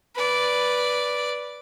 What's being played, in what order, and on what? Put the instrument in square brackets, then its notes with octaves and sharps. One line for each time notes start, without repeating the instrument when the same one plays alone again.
[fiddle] B4 D5